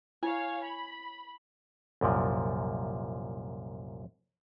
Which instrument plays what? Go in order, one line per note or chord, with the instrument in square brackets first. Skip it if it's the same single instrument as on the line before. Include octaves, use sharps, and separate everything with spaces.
[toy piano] E4 [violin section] C#5 F5 [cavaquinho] G#5
[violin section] B5
[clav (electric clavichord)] C2 F#2 A#2 F3